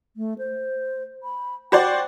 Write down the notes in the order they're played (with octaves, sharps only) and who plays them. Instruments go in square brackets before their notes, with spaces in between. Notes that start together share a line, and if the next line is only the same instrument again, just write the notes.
[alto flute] A3
C5
B5
[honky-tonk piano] F#4 C5 D5 [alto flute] G5